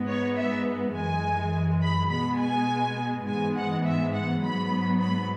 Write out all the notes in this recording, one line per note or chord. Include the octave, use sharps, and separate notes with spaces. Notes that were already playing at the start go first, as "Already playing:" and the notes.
Already playing: G#2 G#3 B3
C#5
E5
F#2 E3 G#3 G#5
B5
B2 G#3 B3 B5
G#5
G#2 E3 G#3 B3 G#5
F#5
E5
F#5
G#2 F#3 B3 B5
B5